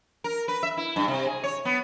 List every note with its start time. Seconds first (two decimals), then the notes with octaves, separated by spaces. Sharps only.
0.24 A#4
0.48 B4
0.63 E5
0.77 E4
0.96 G2
1.08 C3
1.26 G#4
1.43 C#5
1.65 B3